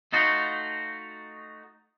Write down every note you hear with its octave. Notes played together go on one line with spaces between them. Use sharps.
A3 D#4 F4 F#4